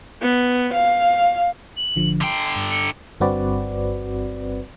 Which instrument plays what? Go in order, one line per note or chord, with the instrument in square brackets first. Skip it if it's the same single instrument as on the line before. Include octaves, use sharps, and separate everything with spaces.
[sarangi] B3
F5
[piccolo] F#7
[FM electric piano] G#1 D3 F3
[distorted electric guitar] D3 G5 [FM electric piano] C6 [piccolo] C7
[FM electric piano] G2
[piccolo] C#7
[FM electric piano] G1 G2 C4 F#4 B4 D5